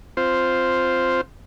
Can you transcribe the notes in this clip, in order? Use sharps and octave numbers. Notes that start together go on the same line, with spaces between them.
C4 F4 C5